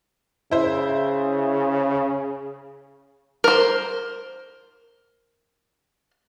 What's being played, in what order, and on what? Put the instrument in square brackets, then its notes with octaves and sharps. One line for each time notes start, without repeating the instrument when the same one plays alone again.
[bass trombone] C#3 [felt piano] E4 C5
[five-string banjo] A#4 C5